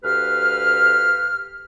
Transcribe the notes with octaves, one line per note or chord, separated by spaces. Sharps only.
D2 G4 B4 F5 F6